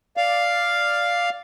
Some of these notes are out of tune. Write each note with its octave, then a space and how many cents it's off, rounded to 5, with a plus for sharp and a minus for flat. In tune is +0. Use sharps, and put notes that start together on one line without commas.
D5 +0 F5 +0